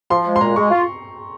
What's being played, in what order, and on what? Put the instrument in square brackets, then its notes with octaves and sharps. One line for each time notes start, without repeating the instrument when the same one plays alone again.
[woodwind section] F3 [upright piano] C6
[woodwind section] G#3
[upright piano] C6
[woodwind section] A#2 [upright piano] A#5
[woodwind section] G#3 [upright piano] C#6
[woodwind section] F4